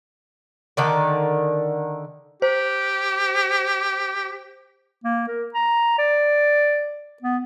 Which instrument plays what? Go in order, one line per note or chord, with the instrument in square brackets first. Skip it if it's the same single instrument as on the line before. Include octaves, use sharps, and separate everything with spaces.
[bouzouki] D3 D#3 D5
[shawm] G4 [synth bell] C5
[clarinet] A#3
A#4
A#5
D5
B3